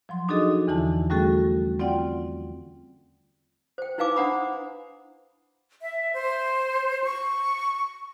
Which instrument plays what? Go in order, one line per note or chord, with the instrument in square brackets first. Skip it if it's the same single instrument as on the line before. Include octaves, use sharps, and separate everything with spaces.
[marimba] F3 F#3 C6
D4 D#4 F#4 G#4 A4 D#5
E2 D3 E3 E4 A5
G3 A3 C#4 F#4 G#4 A4
C4 F4 D5 F#5 G5
[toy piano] C5 G5
D#4 E4 B4 F5 G#5 D6
D4 C5 F#5 A#5 B5 D#6
[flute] E5
C5
C#6